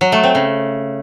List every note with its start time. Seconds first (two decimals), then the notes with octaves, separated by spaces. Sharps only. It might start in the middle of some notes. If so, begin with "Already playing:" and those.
0.01 F#3
0.12 A3
0.24 C4
0.35 C#3